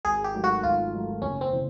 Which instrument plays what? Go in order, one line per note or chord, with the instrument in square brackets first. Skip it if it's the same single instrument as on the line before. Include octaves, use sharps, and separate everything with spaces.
[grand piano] G#1 [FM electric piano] G#4
[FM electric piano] G4
[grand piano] G#2 D#3 F#3 A3
[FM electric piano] F#4
[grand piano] G#1 [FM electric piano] F4
[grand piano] G#2 D#3 F#3 A3
[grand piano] F#1 [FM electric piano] C#4
[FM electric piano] C4
[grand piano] C#3 E3